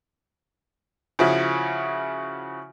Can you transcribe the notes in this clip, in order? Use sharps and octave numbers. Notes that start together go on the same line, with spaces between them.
C#3 F3 E4 F#4